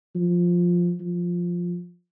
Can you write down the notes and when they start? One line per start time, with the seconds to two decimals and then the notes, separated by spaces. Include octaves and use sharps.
0.15 F3
1.00 F3